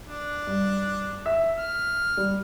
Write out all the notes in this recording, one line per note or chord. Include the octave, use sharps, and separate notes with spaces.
D4
G2
E5
F6
G3